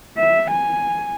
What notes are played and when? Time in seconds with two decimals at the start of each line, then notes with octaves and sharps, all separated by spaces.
0.17 E5
0.51 G#5